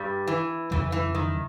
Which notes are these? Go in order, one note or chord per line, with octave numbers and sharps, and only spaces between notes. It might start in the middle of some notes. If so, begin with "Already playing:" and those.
Already playing: G2 G3
E3
F2 C#3 E3 F#3
E3
D#3